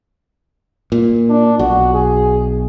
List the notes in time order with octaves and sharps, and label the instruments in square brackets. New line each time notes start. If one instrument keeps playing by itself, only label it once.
[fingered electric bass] A#2
[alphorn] D4
[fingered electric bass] B1 [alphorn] F#4
[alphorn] G#4